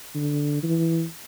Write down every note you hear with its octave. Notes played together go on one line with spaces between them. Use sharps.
D3
E3